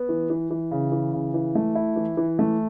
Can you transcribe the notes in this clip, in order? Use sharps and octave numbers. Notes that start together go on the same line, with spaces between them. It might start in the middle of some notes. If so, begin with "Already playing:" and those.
Already playing: B3
E3
E3
E3
C#3
E3
C#3
E3
A3
E4
E3
E3
A3